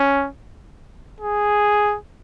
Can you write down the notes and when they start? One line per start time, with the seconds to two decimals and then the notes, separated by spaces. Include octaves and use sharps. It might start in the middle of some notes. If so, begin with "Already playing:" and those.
Already playing: C#4
1.20 G#4